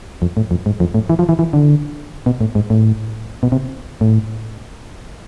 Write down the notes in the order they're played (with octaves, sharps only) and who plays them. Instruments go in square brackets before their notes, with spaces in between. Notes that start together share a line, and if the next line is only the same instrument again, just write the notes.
[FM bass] F2
A2
F2
G#2
F2
A2
E3
F3
E3
E3
D3
B2
A2
G#2
A2
B2
C3
A2